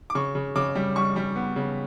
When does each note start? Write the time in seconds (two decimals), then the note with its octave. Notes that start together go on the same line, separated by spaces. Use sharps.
0.10 D6
0.15 C#3 C#6
0.35 C#3
0.55 C#3 D6
0.75 G3
0.96 G3 C#6
1.16 G3
1.36 B3
1.56 C#3